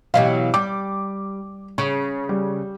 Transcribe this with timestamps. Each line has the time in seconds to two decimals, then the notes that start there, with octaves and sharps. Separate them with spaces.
0.14 B2 E3 F#3 G4 D#5 F5
0.54 G3 D6
1.78 C#3 C#6
2.29 G3